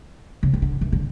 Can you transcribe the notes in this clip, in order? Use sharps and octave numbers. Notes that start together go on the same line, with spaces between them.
C#3
C#3
D3
E3
D3